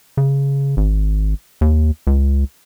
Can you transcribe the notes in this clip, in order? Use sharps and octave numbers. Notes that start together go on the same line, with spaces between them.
C#3
G#1
D#2
C#2